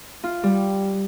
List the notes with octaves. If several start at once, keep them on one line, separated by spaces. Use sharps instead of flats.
F4
G3